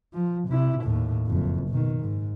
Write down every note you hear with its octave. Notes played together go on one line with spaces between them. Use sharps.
F3
C3 E4
D#2 A2
F#1 F2
B2 D#3
G#2